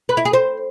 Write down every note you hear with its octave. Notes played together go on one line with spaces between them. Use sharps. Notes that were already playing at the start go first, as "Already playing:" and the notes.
B4
E4
G#4
C5